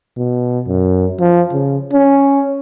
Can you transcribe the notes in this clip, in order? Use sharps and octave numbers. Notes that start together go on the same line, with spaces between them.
B2
F#2
F3
C#3
C#4